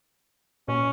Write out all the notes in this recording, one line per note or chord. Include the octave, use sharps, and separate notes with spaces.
A#2 C#4